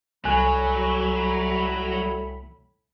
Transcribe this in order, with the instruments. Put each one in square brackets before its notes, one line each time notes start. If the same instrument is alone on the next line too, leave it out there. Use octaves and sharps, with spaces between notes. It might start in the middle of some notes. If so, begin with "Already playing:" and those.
[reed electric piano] C2 G#5 F#6 [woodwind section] A2 G3 B5 [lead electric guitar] F#3